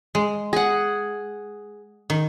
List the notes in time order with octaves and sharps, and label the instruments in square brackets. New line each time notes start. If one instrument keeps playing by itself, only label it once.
[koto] G#3
[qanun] G#4 F#5
[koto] D#3